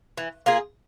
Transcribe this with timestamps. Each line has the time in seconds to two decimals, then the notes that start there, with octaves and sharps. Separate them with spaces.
0.17 E3
0.46 A#3 F4 G#4